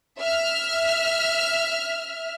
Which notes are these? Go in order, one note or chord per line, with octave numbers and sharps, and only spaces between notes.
E5 F6